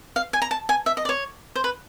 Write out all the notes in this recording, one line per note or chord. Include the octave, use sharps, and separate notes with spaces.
F5
G#5
A#5
A5
G#5
E5
D#5
D5
C#5
C5
B4